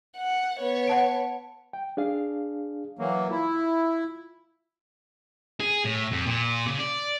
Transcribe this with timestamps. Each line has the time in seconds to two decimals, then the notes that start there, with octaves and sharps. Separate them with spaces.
0.17 F#5
0.59 B3 C#5
0.87 F#5 A5 D7
1.73 G5
1.97 D4 G#4 F5
2.99 E3 F#3 A#3
3.31 E4 F4
5.60 G#4
5.84 A2
6.11 F2
6.26 A#2
6.66 C#3
6.79 D5